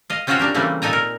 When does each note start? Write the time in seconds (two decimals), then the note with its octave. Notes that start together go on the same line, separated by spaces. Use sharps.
0.10 D#5 F5
0.27 C4 C#4 F4 F#4 C5 C#5
0.39 D4 G4 A#4
0.54 C#3 E3 G3 A3 A#3 C4
0.82 A#2 D#4 A4 G#5 A#5
0.93 A#4